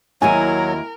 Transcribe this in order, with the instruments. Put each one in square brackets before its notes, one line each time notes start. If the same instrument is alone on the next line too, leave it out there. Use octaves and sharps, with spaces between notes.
[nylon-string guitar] D#2 E4 F#4 [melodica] F#3 [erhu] A#4 [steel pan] G#5